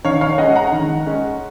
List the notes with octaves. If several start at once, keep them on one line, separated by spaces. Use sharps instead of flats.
D#3 C#5 F5
C#5 F5
G#3 C#4 D#5 F#5
F#5 A#5
D#3
G#3 C#4